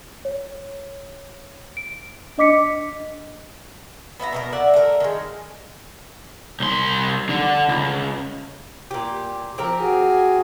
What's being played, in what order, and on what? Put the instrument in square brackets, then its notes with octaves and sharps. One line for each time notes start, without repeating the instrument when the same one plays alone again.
[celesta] C#5
D7
D4 D#5 D6 B6 C#7
[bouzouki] B3 E5 F5 A#5
B2 B3 A#4
D5 E5 F#5
A3 A#4
D#3 G#3
[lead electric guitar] C2 C6
D3
C#2
[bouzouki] A#2 G4
[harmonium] F3 [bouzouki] C4 G4 A#4
[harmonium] F#4 G#4 G#5